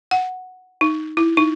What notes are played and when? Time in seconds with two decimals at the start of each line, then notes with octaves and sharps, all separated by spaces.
0.11 F#5
0.81 D#4
1.17 E4
1.37 D#4